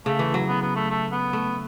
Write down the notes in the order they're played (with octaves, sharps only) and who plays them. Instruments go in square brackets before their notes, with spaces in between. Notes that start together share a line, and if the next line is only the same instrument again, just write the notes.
[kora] C#3 [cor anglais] A3
[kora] E3
F#3
[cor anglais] B3
B3
A3
A3
B3
[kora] A3